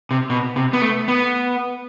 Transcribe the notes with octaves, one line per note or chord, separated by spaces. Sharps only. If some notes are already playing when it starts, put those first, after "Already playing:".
C3
B2
C3
B3
A3
B3